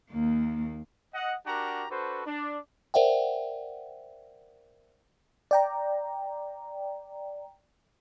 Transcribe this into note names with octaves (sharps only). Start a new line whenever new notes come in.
D#2 A#3
D#5 F#5
D4 F#4 G4 A#4 F#5 A#5
D4 F#4 A4 B4 C5
D4
A#4 C5 D5 E5 F#5 G5
D5 G5 A#5